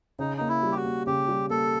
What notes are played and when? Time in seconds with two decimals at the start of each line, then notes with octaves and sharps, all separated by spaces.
0.19 C#3 D#4
0.37 A#3 D#4
0.48 E4
0.63 G3
0.72 G4
0.77 F#4
0.85 A#3
1.07 C#3 G4
1.28 G3
1.50 A#3 A4